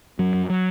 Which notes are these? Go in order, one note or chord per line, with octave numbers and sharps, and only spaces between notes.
F#2 F#3
F#2
F#3